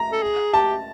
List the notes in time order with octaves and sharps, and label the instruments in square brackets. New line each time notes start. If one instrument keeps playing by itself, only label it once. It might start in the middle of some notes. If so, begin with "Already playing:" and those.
Already playing: [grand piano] A#5
[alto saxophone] A4
G#4
[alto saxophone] G4 [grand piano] A5